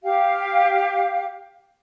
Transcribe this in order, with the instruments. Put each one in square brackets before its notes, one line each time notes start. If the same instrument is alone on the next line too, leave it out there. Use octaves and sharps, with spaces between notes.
[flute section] G4 F5